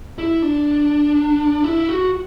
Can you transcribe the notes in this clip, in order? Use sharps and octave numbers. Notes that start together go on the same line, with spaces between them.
E4
D4
E4
F#4